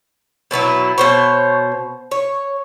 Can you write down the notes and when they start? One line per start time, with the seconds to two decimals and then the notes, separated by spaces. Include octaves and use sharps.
0.51 B2 F#3 B3 E4
0.98 B2 C5 C#5
2.11 C#5